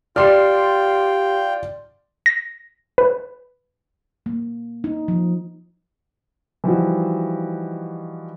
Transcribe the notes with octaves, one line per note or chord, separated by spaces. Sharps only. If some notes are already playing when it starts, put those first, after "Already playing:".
F4 G4 D5 G5 C6 F6
A#6
B4
A#3
D#4
F3
E3 F3 G3 D#4 F#4